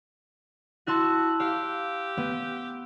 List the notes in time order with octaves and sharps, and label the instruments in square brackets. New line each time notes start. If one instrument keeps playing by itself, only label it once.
[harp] E4 A5 [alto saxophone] F#4 [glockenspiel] C6 E6 F#6
[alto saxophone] G4 [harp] F5
[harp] B3